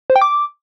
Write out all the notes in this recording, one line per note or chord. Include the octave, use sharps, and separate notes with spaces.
C5
G5
D6